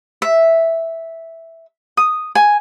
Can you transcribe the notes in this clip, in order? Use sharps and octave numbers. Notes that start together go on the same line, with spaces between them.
E5
D#6
G#5